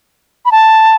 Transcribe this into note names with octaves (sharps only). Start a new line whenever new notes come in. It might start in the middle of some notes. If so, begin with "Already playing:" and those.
B5
A5